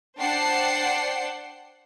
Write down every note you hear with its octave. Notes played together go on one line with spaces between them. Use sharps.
D4 C5 F#5 G5 A5 C7